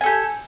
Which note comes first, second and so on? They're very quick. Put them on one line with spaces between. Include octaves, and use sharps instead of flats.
G#5 A4 G4